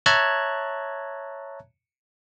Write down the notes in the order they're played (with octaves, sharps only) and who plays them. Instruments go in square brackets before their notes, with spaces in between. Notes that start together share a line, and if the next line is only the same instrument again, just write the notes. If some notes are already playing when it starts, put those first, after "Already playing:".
[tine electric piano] C#5 E5 A5 A#5 F#6 G#6